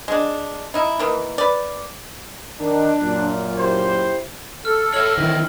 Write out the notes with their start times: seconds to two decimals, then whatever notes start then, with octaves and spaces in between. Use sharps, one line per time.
0.08 G#3 D4
0.74 D#4 E4
0.99 D#3 E3 A#3
1.38 B4 D5
2.59 D#3 D4
2.99 F#2 A#2
3.57 E4 G4 C5
4.65 A4 F6
4.94 C#5 E5 F6 F#7
5.18 D#3 E3 C4